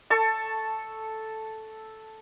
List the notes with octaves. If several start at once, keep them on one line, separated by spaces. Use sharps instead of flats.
A4 A5 C#6